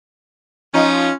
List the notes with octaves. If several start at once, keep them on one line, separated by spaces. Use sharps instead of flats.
F3 C#4 D#4 F4